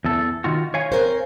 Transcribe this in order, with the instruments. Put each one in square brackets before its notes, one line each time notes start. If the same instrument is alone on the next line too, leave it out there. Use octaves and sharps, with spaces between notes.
[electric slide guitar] E2 A4
D#3 F4 F#4
C#5 F5 G#5
[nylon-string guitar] C4 A#4 C5